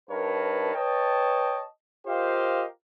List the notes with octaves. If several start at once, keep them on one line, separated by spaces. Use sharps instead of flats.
G2 D#4 A#4 B4 C#5 A5
B4 C#5 D#5 G5 A5
F4 G4 A#4 C5 D#5 F5